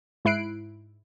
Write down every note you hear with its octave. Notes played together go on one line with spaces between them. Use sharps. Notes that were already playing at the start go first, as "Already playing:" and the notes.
G#2 E4 F#6 C7 D7